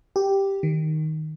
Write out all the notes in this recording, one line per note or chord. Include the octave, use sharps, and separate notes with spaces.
G4
D#3